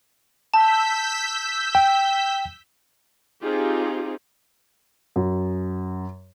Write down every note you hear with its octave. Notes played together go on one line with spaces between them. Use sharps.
A5 E6 G6 B6
G5
C4 D#4 F4 G4 G#4
F#2